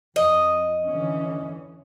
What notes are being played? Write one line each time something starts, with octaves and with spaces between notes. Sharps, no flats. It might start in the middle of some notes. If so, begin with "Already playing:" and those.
F2 D#5
D3 E3 C#4